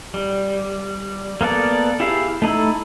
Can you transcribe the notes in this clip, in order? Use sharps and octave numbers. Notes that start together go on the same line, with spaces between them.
G3
A#3 B3 A4 D5
E4 G4 G#4 E5 F5
A3 D#4 E4 A4